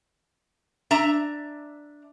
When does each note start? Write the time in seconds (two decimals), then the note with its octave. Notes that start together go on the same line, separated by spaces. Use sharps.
0.91 D4 E5 A#5